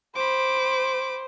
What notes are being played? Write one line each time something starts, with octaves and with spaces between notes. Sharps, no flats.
C5 B5 D6